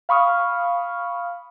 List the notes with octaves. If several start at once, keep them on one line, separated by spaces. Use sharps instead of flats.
F5 B5 C#6 D#6 F6